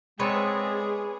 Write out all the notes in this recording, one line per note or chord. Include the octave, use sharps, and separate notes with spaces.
G#3 B3 C4 G#4 A4 B4 C#5 D5